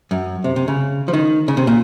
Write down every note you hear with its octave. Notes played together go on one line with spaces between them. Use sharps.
F#2
C3
C3
C#3
F3
D#3
C#3
C3
A#2